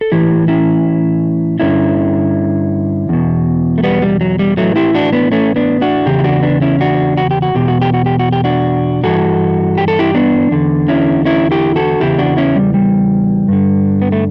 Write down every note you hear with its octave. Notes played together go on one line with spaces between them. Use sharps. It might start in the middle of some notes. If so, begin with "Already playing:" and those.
A4
A2 E3 E4 G4
C#4 E4
G2 D3 C#4 E4
E2 B2
A3
G3 B3
G3
F#3
G3
A2 E3 F#3 A3
E4 G4
D4 F#4
B3 D4
A3 C#4
B3 D4
D4 F#4
E2 C#3 G4
E4
D4 F#4
B3 D4
C#4 E4
D4 F#4
F#4
G4
F#4
E2 B2 G4
F#4
G4
F#4
G4
F#4
G4
D4 F#4
G2 E3 F#4 A4
G4
A4
E4 G4
B3 D4
E2 D3
C#4 E4
C#4 E4
E4 G4
F#4 A4
E2 C#3 E3 E4 G4
D4 F#4
C#4 E4
G3
G3
G2 D3
B3
A3